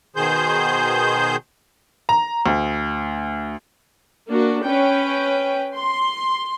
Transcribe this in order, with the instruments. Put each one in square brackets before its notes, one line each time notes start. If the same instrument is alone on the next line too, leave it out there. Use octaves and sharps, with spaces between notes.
[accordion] B2 D#3 G#4 C5 G6
[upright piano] A#5
D2
[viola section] A#3 D4 F#4
C#4 B4 G5
C6